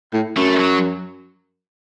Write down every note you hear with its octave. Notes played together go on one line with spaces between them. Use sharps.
A2
F#2 A3
F#3